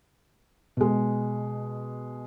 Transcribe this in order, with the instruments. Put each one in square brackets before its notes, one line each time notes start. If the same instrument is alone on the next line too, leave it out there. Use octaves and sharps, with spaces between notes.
[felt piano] B2 G#3